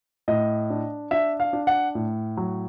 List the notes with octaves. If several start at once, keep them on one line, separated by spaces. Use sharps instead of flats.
A2 D#5
D4
D4 E5
F5
D4
F#5
A2
F#3